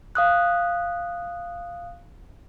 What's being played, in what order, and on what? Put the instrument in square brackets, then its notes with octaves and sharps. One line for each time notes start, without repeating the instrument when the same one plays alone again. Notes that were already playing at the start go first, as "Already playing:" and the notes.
[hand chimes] F5 D#6 F#6